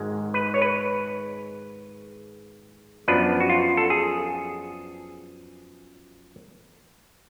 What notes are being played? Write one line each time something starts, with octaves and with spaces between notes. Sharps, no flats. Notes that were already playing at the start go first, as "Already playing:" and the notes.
Already playing: G#1 G#2 G#3
B4
C#5
B4
F#2 F3 B3 D4 B4
F#4
F4
A4
G#4